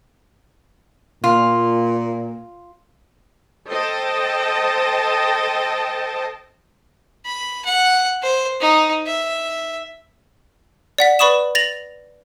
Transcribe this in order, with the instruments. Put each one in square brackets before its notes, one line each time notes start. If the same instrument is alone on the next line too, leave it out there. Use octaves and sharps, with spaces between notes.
[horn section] A#2 [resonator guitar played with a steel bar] F4
[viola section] A4 C5 D#5 G5 A5
[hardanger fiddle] B5
F#5
C5
D#4
E5
[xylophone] D5 F#5 B6
B4 D5 B5 C#6 D#6 E7
A6 A#6 F7 F#7